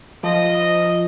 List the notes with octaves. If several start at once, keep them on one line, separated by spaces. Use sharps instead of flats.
F3 D#5